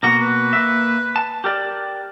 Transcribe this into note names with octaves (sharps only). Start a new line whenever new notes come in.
B2 A#3 F#4 A#5
B4
A#3 E5
A5
G4 A#4 D5